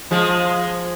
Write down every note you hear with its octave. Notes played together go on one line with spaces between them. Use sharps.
F3 G#3